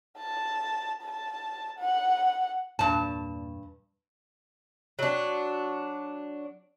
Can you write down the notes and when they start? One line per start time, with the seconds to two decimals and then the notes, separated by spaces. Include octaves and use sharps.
0.19 A5
1.03 A5
1.79 F#5
2.79 E2 G2 A#2 A5
4.99 F#3 D4